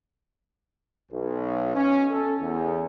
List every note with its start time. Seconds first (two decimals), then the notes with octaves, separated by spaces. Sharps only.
1.11 B1
1.75 C#4
2.11 A4
2.41 E2